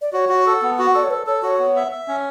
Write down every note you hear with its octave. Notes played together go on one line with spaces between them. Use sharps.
D5
F#4 C#5
F#4
A4
B3
F#4
A4 D5
C#5
A4 B4
A4 C#5
F#4 C#5
B3
E5
E5
C#4